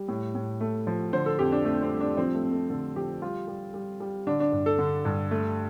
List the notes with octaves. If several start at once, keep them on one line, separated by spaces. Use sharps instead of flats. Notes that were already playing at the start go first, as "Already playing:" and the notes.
Already playing: G3
A2
A2
A3
F3
D3 C5
A4
F2 G4
D4
F2 A3
C4
G3
D4
F3 C4
A3
F2
A3
D3 A4
F3 G4
G3 F4
G3
G3
G3
D3 D4
D4
G2
A4
D3
G2
A3